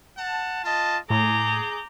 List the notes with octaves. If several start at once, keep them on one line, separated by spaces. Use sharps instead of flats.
F#5 A5
F4 D#5 A5
A2 G#4 A#5 D6 G6